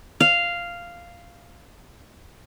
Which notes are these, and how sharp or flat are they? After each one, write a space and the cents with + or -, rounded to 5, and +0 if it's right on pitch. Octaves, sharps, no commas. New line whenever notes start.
F5 -5